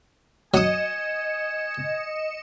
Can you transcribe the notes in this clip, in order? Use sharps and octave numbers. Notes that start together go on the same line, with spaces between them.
F#3 D#5 G#5 D#6 C#7 E7